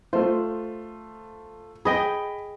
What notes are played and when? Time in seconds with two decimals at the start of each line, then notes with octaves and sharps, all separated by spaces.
0.13 A3 F4 C5
1.85 G#4 D#5 G5 B5